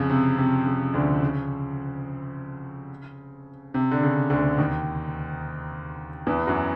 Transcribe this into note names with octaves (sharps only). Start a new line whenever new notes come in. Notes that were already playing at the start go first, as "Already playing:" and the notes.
Already playing: F2 C#3 F3
C3
C3
C#3
D2 D3
C#3
C3
D3
C#3
D2 D3
D#2 D#3
E2 E3
F#2 F#3